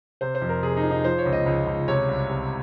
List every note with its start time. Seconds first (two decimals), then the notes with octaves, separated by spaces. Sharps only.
0.21 C3 C5
0.35 C5
0.42 F2
0.49 A#4
0.63 C3 G#4
0.77 D#4
0.84 F3
0.91 D#4
1.04 F3 C5
1.18 C#5
1.25 C#2
1.32 D#5
1.46 C#2
1.67 C#2
1.88 C3 C#5
2.08 C2
2.29 C3